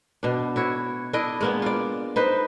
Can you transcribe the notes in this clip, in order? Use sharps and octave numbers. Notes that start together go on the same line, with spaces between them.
B2 D4
E4 F#4 C#5
D4 E4 D5 D#5
G#3 A#3 B3
F4 D5
D#4 B4 C5